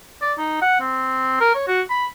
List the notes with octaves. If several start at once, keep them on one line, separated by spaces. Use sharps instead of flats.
D5
D#4
F#5
C4
A#4
C#5
F#4
B5